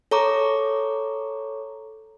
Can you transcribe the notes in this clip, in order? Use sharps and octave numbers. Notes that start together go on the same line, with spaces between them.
A4 C#5 A#5 C#6 D6